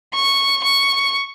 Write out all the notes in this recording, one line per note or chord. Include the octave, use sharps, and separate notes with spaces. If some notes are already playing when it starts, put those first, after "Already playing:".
C#6
C#6